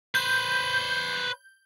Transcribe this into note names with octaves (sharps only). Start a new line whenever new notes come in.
B4 C5 G6